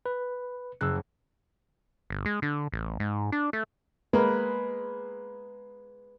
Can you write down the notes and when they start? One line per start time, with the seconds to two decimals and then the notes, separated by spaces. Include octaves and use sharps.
0.06 B4
0.81 F#1 E6 F#6
2.10 G1
2.26 G#3
2.42 D3
2.72 A1
3.00 G#2
3.32 D4
3.53 A3
4.13 G#3 A#3 B4